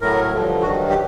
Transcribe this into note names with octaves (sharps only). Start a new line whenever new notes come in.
A2 F#3 A#4
G2 D3 F3
G2 D#3 F#3 F#4
G4